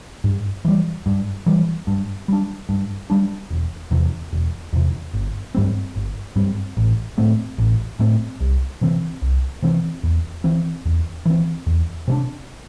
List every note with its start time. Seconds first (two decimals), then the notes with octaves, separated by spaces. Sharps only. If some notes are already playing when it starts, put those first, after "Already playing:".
0.24 G2
0.65 E3 G3
1.06 G2
1.46 E3 G3
1.87 G2
2.28 G3 D4
2.69 G2
3.10 G3 D4
3.50 E1
3.91 E2 C3
4.33 E1
4.73 E2 C3
5.13 G1
5.55 G2 G3 C4
5.96 G1
6.36 G2 G3 C4
6.77 A1
7.18 A2 A3 C4
7.58 A1
7.99 A2 A3 C4
8.40 C2
8.81 C3 E3 C4
9.22 C2
9.62 C3 E3 C4
10.03 E2
10.44 E3 C4
10.85 E2
11.26 E3 C4
11.66 E2
12.08 C3 A3 D4